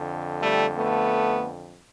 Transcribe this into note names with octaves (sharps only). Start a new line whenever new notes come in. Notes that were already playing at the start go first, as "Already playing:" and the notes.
Already playing: F2 D3
G3 A3
A3 B3